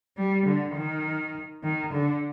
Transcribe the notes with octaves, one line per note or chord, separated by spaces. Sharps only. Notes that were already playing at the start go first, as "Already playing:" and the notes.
G3
D3
D#3
D#3
D3